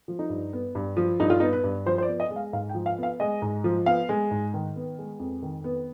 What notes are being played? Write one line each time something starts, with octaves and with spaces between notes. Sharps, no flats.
F3
D#4
G2
B3
G2
F3
G2 D#4
F4
B3 D#4
B4
G2
F3 C5
C5
D5
B3
D#5
G#3
F5
G#2 F5
G5
F3
F5
B3
F5
G#3 D#5
G#2
F3
B3 F5
G#3
G#2
D#3
B3
G#3
F2
D#3
B3